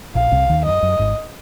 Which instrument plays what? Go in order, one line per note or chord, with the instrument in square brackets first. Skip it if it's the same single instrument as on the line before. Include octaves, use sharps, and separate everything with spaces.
[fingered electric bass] A#1 A#2 [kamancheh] F5
[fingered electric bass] C2 C3
D#2 D#3
[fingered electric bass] F#2 [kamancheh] D#5
[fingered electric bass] F#2
G#1 G#2